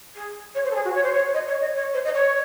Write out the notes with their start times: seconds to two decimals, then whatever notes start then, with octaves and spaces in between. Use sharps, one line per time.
0.15 G#4
0.54 C#5
0.64 C5
0.70 A4
0.75 G#4
0.84 F#4
0.94 C#5
1.03 C5
1.13 C#5
1.33 D#5
1.47 C#5
1.60 D#5
1.75 C#5
1.93 C5
2.04 D#5
2.14 C#5